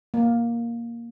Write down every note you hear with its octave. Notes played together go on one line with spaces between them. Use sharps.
A#3